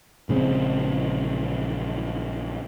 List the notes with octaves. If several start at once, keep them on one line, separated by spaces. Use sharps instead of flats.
A#1 C#3 G#3 C4